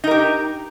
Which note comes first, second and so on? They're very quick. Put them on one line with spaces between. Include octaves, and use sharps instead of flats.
D#4 A#4 G4